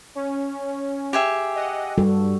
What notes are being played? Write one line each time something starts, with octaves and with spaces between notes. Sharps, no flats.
C#4
G4 G#4 E5
D#5 F#5
G2 G3 F#4 A4